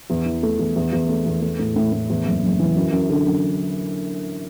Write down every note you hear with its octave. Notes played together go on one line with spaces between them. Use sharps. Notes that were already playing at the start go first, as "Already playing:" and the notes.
E2
E3
A3
E2
E2
E2
A3
E2
A3
A2
A2
A2
E2
F#1
F#1
E3
F#2
F#2
D3
F#2